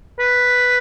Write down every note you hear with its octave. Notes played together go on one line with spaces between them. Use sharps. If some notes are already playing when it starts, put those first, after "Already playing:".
B4